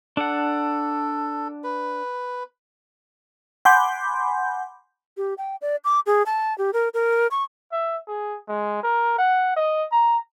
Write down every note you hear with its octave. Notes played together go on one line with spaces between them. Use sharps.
D4 A4 F#5
B4
F#5 G#5 B5 C6 D6 G6
G4
G5
D5
D6
G#4
A5
G4
A#4
A#4
C#6
E5
G#4
G#3
A#4
F#5
D#5
A#5